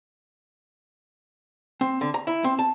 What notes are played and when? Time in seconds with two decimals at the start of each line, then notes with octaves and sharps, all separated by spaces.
1.81 C4
2.01 D3
2.14 A#5
2.27 E4
2.44 C4
2.59 A5